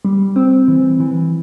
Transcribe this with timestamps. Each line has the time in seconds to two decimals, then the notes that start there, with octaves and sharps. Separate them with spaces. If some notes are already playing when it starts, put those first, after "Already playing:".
0.05 G3
0.36 C4
0.68 E3
1.00 E3